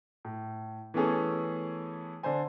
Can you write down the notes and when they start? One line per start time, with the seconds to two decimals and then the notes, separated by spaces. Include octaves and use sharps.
0.25 A2
0.94 E3 A3 B3 C#4 G#4 A4
2.23 D3 D4 C5 G#5